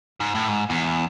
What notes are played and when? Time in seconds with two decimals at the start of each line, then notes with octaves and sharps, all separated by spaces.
0.20 G#2
0.35 A2
0.48 G#2
0.70 E2